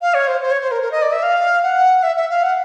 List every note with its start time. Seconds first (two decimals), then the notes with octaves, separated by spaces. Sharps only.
0.02 F5
0.14 C#5
0.27 C5
0.41 C5
0.51 C#5
0.61 C5
0.71 A#4
0.82 A#4
0.91 D#5
1.02 D5
1.12 E5
1.23 F5
1.63 F#5
2.03 E5
2.16 E5
2.30 F5
2.43 F#5